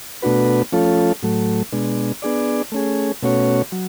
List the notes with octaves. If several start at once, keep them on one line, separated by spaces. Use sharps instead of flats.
B2 A3 D4 F#4 B4
F3 A3 C#4 F4 A4
A2 F#3 A3
B2 G#3 D4
B3 D4 G#4 D5
A3 C#4 G#4
B2 A3 C#4 F#4 C#5
F#3